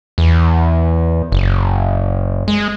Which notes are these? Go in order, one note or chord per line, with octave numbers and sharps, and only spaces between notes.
E2
F#1
G#3